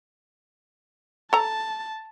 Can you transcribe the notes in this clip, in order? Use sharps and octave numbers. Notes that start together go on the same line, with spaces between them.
A4 A5 A#5